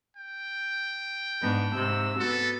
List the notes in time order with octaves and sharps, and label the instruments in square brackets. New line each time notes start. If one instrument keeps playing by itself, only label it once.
[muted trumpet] G5
[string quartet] G#2 B3 D4
G#2 C3 E6
[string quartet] B3 F#4 [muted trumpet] A4